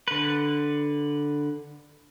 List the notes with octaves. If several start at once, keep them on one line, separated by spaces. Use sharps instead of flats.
D3 B4